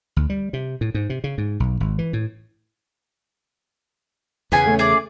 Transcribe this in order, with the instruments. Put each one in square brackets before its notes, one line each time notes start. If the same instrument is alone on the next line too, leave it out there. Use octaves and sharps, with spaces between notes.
[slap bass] D2
G3
C3
A2
G#2
C3
C#3
G#2
B1
G#1
E3
A2
[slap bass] E2 C#3 [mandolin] B3 G#4 G#5
[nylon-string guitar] A3 C#4
[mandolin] G#4 D5